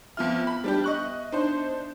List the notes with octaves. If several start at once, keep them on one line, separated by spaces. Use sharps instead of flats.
F2 B3 F4 E5 F6
B5
G3 D4 G4
D#5 C#6 F#6
D4 D#4 C5